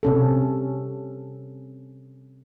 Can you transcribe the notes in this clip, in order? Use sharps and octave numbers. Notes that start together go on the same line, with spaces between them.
C3 C#4 A4